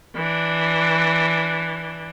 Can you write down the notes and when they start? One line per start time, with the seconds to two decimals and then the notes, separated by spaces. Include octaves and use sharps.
0.15 E3 D4